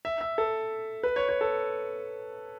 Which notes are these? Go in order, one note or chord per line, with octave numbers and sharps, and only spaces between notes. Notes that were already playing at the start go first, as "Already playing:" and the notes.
E5
E5
A4
B4
C#5
C#5
A4